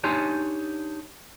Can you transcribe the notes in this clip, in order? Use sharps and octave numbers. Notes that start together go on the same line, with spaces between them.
D4 D#4 G4 C#5 G#5 C6